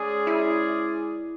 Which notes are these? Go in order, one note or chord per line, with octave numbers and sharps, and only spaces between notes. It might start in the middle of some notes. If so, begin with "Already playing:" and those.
Already playing: G#3 C#4 G#4 D5
E4